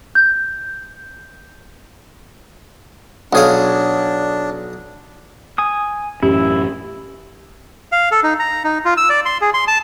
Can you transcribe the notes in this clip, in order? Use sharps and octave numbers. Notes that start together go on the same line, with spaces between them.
G6
B1 D4 G#4 C#5 F5 F#5
G#5 D#6
A1 F#2 C#4 E4 G4
F5
A4
D#4
A#5
D#4
F4
E6
D5
C6
G#4
C6
A5